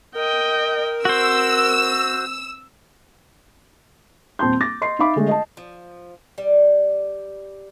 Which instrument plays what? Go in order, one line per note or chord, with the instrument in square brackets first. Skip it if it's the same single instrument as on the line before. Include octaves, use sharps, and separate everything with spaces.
[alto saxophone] A#4 [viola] D#5 G5
[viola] C4 [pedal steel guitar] F#4 C5 [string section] E6
[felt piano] D#1 C4 A5 C6 G6
D6 A6 A#6
D#5 C6 C7
D#4 E5 F5 B5 D6
D3 G#3 A3
D#5 A5
[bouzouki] F3
G3